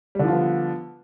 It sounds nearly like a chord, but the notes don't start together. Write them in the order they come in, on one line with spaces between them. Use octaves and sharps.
G3 D3 F3 F4 B3